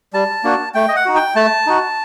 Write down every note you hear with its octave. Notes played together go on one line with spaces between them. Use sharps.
G3 A5
A#3 D4 F#4
A3 G5
D#5
F#5
D#4 F#4
G5
A3 A5
D#4 F#4